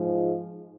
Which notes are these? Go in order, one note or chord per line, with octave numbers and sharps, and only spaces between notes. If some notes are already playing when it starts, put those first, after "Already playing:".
Already playing: G#2 F3 G#3